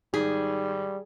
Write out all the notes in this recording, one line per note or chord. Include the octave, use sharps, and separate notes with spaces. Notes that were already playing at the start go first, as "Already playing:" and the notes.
G#2 D#3 G3 G#4